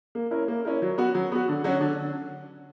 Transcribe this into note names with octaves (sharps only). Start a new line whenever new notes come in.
A#3
C#4 E4 A#4
A#3
C#4 E4 A#4
F#3
B3 F#4
F#3
B3 F#4
D3
F#3 C#4 F#4
D3